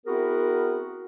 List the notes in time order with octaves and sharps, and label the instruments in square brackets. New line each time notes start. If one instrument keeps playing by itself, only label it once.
[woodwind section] B3 C4 E4 F#4 G#4 A#4